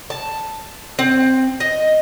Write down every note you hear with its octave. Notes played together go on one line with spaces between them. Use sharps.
A5
C4
D#5